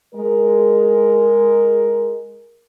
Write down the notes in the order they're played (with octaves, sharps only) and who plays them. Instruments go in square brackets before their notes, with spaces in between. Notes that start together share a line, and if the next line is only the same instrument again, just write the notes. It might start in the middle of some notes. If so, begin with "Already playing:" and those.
[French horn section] G#3 A#4